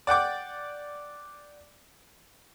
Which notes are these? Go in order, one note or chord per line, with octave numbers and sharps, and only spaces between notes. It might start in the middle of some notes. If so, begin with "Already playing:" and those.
D5 F#5 G5 D6